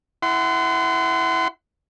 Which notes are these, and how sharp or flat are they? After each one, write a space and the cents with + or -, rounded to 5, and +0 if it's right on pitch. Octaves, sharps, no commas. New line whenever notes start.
E4 +0 F#5 +20 C6 -30